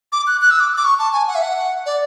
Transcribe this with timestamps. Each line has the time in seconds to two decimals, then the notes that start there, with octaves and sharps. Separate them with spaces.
0.12 D6
0.27 F#6
0.41 F#6
0.51 E6
0.60 D6
0.77 D6
0.84 C#6
0.99 A5
1.13 G#5
1.28 F#5
1.35 E5
1.42 F#5
1.86 D5